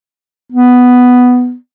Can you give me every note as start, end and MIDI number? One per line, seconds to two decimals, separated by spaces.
0.52 1.54 59